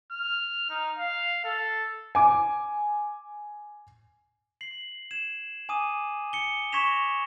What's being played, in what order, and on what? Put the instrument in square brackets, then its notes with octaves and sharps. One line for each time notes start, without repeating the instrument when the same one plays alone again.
[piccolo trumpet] F6
D#4
F5
A4
[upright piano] G#5 D6
[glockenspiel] C7 F#7
G#6 E7
G#5 D6 D#6 D#7
C#7 G7
C#6 G#6 A#6 B6 E7 F7